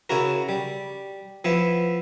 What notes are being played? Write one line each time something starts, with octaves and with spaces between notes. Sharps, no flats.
C#3 E4 F#4 A#4
G3
F3 B3 E4